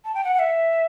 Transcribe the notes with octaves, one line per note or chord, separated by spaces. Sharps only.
A5
G5
F#5
F#5
E5